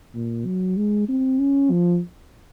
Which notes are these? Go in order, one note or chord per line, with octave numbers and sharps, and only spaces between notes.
A#2
F#3
G#3
C4
C#4
F3